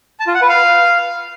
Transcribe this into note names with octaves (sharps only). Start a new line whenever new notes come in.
A5
F4
F#5
B4
F5